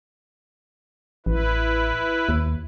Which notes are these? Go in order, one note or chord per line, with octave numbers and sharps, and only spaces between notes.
A1 E4 B4
D#2